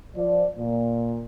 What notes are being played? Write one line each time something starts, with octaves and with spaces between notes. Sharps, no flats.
F3 D5
A#2